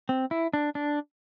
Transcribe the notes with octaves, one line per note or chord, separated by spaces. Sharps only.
C4
E4
D4
D4